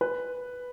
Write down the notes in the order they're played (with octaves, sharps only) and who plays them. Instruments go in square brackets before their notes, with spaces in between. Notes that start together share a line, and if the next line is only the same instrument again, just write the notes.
[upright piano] B4